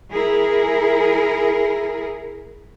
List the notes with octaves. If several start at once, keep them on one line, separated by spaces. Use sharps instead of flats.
E4 G#4 A#4